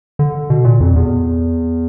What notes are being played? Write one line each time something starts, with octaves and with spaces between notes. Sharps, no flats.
D3
B2
A#2
F2
E2